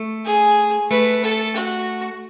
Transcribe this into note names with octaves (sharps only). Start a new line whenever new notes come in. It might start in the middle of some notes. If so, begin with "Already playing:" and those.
Already playing: A3
G#4
A3 B4
A4
F#4